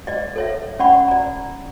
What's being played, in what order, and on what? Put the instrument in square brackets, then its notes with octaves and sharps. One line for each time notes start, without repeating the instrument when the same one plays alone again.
[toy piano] D5 D#5
A4 C#5 E5
C#4 D5 F#5 B5 C#6
D5 A#5